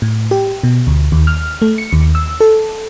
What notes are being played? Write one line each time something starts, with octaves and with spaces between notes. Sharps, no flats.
A2
G4
B2
D2
D#2
F6
A3
C#7
D#2
E6
A4